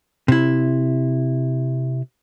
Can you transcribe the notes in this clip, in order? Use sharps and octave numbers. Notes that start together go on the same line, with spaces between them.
C3 E4